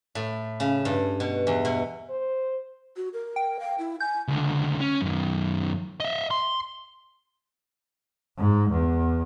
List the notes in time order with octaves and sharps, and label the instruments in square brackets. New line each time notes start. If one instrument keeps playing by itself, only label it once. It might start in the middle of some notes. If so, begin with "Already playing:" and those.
[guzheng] A2
C#3
G2
B2
E2
B2
[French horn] C5
[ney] F#4
A#4
[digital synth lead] G5
[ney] F5
E4
[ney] G#5 [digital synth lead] G6
[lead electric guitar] C#2 D3
C#4
F#2 D#3
D#5 E5
C6
[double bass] G#2
E2